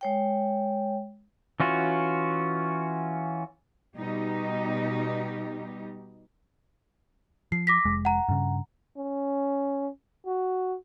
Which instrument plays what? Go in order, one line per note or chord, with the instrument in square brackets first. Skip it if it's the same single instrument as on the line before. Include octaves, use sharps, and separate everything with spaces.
[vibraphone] G#3 C#5 G5
[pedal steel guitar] E3 C#4 F4 F#4
[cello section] B2 G3 D#4 G4
[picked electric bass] F3 [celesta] C7
[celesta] D6 A#6 B6
[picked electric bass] F1 G#3
[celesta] F#5 A#5
[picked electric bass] G2 C#3
[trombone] C#4
F#4